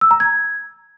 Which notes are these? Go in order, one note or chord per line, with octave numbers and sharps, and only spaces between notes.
E6
A#5
G#6